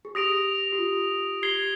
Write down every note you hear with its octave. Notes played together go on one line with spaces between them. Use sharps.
G#4
G4 D#6 A#6 D7 F7
G4
F4
G4 G#6 C7 G7